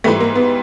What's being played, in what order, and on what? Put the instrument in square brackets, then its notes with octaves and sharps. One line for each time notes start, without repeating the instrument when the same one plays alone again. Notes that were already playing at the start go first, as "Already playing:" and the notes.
[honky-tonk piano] G#2 E3 G3 A3
A#3
B3